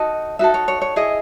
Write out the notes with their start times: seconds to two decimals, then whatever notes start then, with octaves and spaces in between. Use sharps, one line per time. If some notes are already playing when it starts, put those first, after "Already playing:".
Already playing: D#4 F#4 A4 D#5
0.39 D#4 F#4 A4 E5
0.54 C#5
0.68 C#5
0.82 C#5
0.96 E4 G#4 D#5